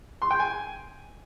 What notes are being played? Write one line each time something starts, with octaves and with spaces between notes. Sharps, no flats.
C6
G5
G#5